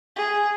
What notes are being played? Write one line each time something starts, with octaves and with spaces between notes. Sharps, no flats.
G#4